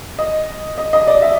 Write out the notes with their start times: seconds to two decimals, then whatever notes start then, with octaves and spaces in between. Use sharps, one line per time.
0.19 D#5
0.78 D#5
0.93 D#5
1.07 D5
1.22 E5